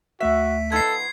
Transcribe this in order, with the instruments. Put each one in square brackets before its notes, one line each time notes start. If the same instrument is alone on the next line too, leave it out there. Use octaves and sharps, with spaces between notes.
[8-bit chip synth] D2 A3 B6 [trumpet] F#4 [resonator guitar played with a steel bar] E5
[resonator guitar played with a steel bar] F3 B3 D#4 [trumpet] A4 [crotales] G#6 C7